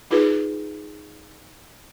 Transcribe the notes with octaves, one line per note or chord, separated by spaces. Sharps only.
D#4 F4 G#4 B4